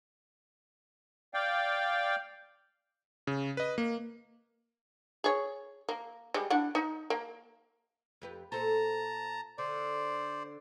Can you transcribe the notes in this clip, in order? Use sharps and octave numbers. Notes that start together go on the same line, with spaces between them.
D5 F5 G5
C#3
B4 D#5
A#3
G#4 C#5
A#3
G3 G#3
D4 E4 F#5
D#4
A#3
F2 G4 B4
A#2 A4 C5 A5 A#5
D3 C5 D5